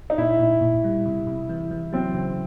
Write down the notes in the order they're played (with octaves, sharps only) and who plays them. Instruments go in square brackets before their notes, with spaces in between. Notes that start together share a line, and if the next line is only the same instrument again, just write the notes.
[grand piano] D#4
[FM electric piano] A#2 [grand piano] E4
[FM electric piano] A#2
A#2
G3
C3
C3
E3
E3
[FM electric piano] F#3 [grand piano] C4
[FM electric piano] C#3